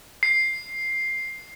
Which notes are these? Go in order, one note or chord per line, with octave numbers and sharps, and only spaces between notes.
C7